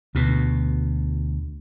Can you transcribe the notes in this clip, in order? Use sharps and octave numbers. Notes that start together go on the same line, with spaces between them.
D2 B2